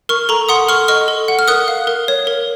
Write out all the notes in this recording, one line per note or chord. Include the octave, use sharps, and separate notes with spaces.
A#4 C#6 F6
A4 A#5 C#6
F#5 C6 D#6
A4 C#6 F6
D#5 C#6 F6
A4
F#5
F6
A#4 D#6 F#6
F5
A#4
C#5
A#4